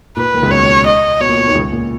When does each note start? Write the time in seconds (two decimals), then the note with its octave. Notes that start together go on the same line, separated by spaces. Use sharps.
0.17 A#2 B4
0.34 D#2 D#3
0.43 C#2 C#3
0.51 B2 C#5
0.86 D#5
1.20 B2 C#5
1.29 A#2
1.38 B2
1.46 D#2 D#3
1.55 C#2 C#3
1.72 A#2